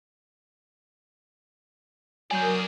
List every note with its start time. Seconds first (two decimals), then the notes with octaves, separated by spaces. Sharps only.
2.31 F#3 G#4 A#4 D5 G#5 D#6 G6